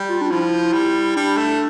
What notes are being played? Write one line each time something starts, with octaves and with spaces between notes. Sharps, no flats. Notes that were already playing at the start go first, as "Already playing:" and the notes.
Already playing: G3
F4
D4
F3 E4
G3
G3 D4
A3